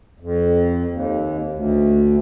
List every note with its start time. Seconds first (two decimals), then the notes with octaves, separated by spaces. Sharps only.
0.20 F2
0.90 D#2
1.53 D2